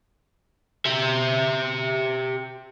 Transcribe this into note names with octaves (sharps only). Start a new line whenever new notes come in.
G4 E5